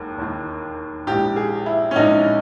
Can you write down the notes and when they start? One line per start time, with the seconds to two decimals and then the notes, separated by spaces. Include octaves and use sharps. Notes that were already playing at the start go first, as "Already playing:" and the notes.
Already playing: E1 D#2
0.17 E1 D#2 D#3
1.07 A#1 G#2 E3 G4
1.36 G#4
1.66 E4
1.91 C#4
1.96 A#1 G#2 E3 D#4